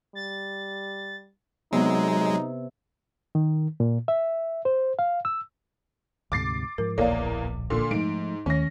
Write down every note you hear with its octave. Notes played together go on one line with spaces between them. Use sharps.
G3 A6
C3 F#3 G#3 B3 D#4
D#3
A#2
E5
C5
F5
E6
D2 G#2 C3 D6 A6 C7
G#2 F3 A#4
D1 A#1 E2 A#3 C#5 D5 F5
A#2 D3
G#2 F3 A3 D7
D#2 D#3 A3 C#4 A#6